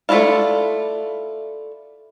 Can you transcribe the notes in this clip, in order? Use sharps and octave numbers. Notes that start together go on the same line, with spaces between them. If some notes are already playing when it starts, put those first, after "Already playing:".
A3 C4 D4 E4 F4